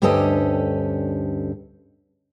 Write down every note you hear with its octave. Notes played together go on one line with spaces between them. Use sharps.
D2 G2 C#4 G4 A4 D#5